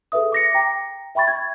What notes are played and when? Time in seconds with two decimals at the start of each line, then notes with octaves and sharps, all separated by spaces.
0.12 G#4 A4 B4 E5 D#6
0.32 D6 A#6 C#7
0.54 G5 A#5 A#6
1.15 E5 G5 B5 C#6 A6
1.28 G#6